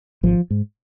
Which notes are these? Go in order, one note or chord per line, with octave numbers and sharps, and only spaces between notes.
G#1 F3
G#2